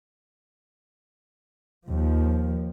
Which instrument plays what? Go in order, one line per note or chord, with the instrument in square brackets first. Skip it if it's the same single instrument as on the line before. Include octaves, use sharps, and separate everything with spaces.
[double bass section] D#2 F3